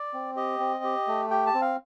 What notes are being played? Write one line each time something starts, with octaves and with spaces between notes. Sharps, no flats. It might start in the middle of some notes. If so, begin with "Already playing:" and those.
Already playing: D5
C4
G4 D#5
C4
G4
A3
G4 G5
A5
C4
F5